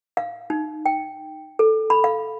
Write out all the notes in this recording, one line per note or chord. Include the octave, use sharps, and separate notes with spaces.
F5
D#4
G5
A4
B5
F5